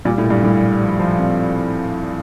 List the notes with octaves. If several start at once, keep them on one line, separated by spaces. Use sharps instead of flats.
A#2 G3
A2
A#2
G2
A2 G3
G3
F3
F3
C4